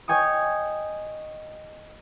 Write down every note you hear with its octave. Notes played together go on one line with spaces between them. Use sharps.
C#5 D#5 G5 G#5 C#6 D#6